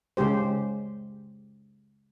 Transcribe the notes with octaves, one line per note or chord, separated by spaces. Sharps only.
C#3 G#3 G4 C5